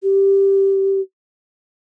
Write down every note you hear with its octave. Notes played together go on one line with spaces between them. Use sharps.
G4